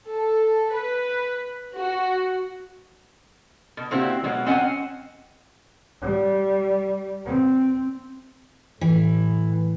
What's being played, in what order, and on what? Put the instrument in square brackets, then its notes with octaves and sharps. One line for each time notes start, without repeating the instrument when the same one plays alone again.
[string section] A4
B4
F#4
[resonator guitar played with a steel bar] B2
A#2 C4 E4 F#4 G4
B2 F#3 G#3
C4 C#4 D#5 F#5 G#5
[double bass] G3
C4
[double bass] A2 [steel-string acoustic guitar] E3